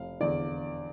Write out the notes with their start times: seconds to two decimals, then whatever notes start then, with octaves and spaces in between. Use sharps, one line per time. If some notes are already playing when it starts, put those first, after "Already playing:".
Already playing: F1 F5
0.20 E2 D3 D5